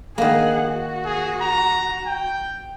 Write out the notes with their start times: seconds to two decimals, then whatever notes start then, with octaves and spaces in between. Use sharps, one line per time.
0.18 D#3 A#3 G#4 F#5
0.68 F#4
1.05 G#4
1.42 A#5
2.07 G5